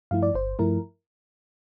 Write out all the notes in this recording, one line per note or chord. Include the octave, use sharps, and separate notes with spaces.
G2 F3 A3 E4 F5
D5
G1 C5
G2 F3 A3 E4 A#4